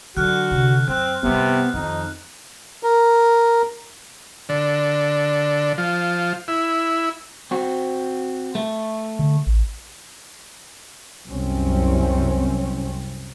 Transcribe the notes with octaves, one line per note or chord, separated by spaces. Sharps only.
D3 F#3 F#4 F6 F#6
C3 D#3
F#2 C4 F#6
G1 C3 G3 B3
F2 D#3 D#4
A#4
D3
F3
E4
C4 F#4
A3
D3
A1
C2 F#2 C4 C#4